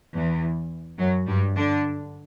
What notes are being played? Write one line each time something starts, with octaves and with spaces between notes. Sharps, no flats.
E2 E3
F#2 F#3
G2 G3
D3 D4